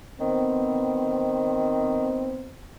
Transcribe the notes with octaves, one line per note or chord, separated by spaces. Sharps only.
D#3 B3 C4